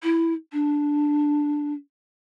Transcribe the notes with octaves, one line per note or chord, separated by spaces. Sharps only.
E4
D4